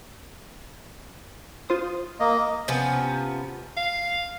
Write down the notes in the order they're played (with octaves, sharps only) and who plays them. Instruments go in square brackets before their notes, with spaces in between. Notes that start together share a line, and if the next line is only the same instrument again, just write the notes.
[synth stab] F4 C5 D#6
[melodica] A#3 D#5
[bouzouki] C3 F3 B3 C#4
[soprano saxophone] F5